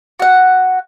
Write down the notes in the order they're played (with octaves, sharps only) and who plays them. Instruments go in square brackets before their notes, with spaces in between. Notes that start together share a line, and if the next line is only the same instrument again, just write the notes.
[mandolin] F#4 F#5